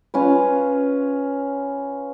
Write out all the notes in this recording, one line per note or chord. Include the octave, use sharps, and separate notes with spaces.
C#4 F4 B4